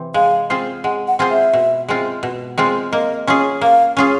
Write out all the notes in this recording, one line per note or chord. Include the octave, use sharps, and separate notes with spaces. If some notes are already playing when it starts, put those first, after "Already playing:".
Already playing: C3 E3 C4
G#3 F5
C4 F4 G#4 C5
G#3 F#5
F#5
C4 F4 G#4 C5
E5
B2
G#3 C4 F4
B2
G#3 C4 F4
A#3 D#5
C#4 F4 G#4
A#3 F5
C#4 F4 G#4